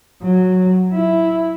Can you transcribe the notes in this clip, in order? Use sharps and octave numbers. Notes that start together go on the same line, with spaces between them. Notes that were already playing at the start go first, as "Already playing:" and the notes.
F#3
E4